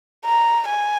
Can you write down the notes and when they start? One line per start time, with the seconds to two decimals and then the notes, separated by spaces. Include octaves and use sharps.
0.25 A#5
0.68 G#5